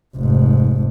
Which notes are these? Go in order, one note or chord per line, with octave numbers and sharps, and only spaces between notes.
F1 G#2